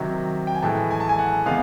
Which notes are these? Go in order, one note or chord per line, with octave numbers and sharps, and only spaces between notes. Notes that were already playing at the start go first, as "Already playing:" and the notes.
Already playing: C3 D#3 F#3
G5
G#5
A2 E3 G#3 A5
G#5
A5
G#5
F#5
C3 D#3 G#3 B3 F5